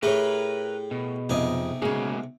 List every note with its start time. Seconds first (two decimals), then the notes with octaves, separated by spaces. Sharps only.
0.03 A2 A3 G4 G#4 A#4 B4 C#5
0.91 B2
1.29 B1 F2 C3 D#5 G#5
1.82 C#3 G#3 A#3 F#4 G#4